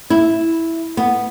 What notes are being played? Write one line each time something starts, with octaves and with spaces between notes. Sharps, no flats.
E4
B3